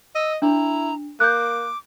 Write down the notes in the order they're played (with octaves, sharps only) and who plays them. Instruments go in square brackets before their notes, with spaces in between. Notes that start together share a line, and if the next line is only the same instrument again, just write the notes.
[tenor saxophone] D#5 [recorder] E6
[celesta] D4 [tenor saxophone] E4 [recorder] A#5
[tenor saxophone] A#3 [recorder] D6 [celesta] F#6 G6